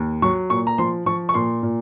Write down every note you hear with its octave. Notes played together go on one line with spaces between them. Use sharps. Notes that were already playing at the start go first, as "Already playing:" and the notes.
Already playing: D#2
F#3 C#6
A#2 C#6
A#5
F3 C6
F3 C#6
C#6
A#2 C6
A#2